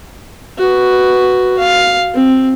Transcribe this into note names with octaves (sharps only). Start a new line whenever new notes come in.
F#4 B4
F5
C4